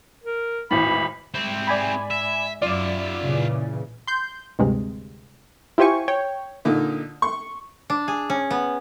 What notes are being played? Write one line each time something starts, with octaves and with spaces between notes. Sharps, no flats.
A#4
G#1 E2 A2 B5
G#2 C4 E4
D5 G#5 B5
E5
F#2 F4 D5 E5
A#2 C#3 E3
C6 G6
D2 G2 C3 G#3
E4 F4 G4 C5 G#5 C#6
C#5 G5
A#2 D3 D#4
C6 C#6
D4
G#4
C#4
B3